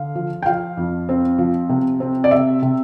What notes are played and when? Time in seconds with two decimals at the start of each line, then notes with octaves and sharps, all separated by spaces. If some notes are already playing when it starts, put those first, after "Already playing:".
Already playing: D3 F5
0.15 F3
0.42 G5
0.46 F3 F5
0.77 F2
1.09 C4
1.38 F3
1.69 C3
2.00 C4
2.24 D5
2.31 C3 E5
2.62 C3